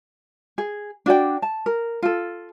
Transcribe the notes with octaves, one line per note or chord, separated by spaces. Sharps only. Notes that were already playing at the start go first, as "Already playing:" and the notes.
G#4
D4 F#4 D5 G5
A5
A#4
F4 A4